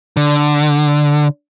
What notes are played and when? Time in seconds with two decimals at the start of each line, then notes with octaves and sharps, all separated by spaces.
0.17 D3